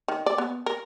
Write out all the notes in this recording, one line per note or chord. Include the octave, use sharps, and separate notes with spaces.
D#3
D5
B3
A#4